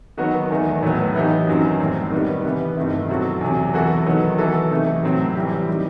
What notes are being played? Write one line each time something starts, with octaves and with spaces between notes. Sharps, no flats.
D#3 F#3 B3 F#4
E2 D#3 A3
A2 F#3 B3
E3 B3 D#4 G4
F#2 D#3 F#3 C4
A2 G3 C4
D#3 G3 B3 E4
C3 E3 B3
G2 D#3 A3 C4 E4
B2 F#3 C4 F#4 A4
E2 C3 F#3
E3 B3 F#4 A4
D#3 F#3 B3
E3 B3 F#4 A4
C3 E3 A3 D#4
A2 F#3 C4
E3 G3 C4 E4 G4
D#3 G3